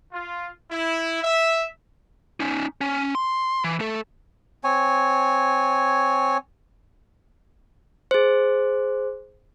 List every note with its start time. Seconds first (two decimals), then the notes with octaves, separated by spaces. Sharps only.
0.12 F4
0.71 E4
1.22 E5
2.40 C#4 D#4
2.81 C#4
3.15 C6
3.64 E3
3.80 A3 A4
4.64 C4 C#5 G#5
8.11 G#4 C5